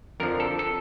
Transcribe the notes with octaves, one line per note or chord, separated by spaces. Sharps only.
F2 D3 F3 A#4
A4
A4